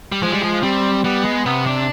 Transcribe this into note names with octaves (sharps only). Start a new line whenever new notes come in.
G3
F3 G#3
G3
F3
G3 C4
G3 B3
G#3
C3 B3
D4